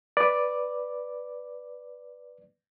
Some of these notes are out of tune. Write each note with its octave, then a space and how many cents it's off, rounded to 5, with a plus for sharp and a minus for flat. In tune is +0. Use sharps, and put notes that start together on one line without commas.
B4 +0 D5 +0